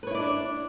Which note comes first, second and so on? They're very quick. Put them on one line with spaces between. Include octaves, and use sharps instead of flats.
B4 C#5 E4 D5 D4